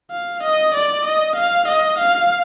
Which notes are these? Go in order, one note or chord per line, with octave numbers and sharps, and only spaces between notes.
F5
D#5
D5
D#5
F5
D#5
F5